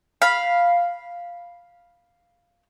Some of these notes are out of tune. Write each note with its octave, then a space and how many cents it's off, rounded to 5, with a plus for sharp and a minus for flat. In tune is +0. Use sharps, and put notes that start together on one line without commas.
F5 +0 B5 -10